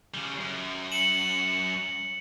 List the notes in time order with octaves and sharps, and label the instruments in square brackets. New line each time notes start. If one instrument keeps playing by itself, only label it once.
[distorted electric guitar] C#3 G3
F#2
[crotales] C#7 E7 F#7